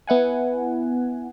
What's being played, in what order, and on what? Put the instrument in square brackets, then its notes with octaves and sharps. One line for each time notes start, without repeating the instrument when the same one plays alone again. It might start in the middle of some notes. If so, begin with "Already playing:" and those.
[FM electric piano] B3 E4 F#5 G#5